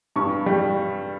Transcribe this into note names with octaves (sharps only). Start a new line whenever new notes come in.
G2 C#6
G3